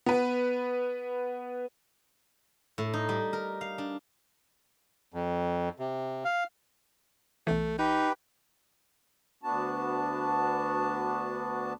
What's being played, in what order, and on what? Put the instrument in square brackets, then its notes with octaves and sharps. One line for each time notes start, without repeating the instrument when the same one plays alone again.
[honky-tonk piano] B3 B4
[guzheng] A2
D#4
G3
A#4
F5
D4
[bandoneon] F2
C3
F5
[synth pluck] B1 E3 [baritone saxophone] A3
[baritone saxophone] D#4 [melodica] G4 B4
[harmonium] D2 B3 D4 F#4 A5